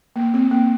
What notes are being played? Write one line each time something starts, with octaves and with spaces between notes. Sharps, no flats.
A#3
C4
A#3